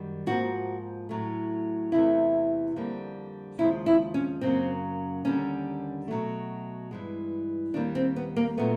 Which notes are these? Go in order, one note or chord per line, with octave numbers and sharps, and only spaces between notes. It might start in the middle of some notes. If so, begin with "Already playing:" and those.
Already playing: F#2 D#3 G3
G#2 F3 A#3 F#4
A2 F#3 A3
E2 C3 E3 A3 E4
F2 D3 G3 A#3
D#2 C#3 F3 G#3 E4
E4
C#4
F#2 C#3 F#3 A#3 C4
D#2 D3 G3 A#3 C#4
B2 F#3 A3
G2 E3 G#3
D#2 D#3 G3 A#3 D4
C4
B3
A#3
A#2 F#3 A3 B3